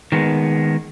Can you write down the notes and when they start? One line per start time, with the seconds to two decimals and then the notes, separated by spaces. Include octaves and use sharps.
0.12 D#3 G#3 B3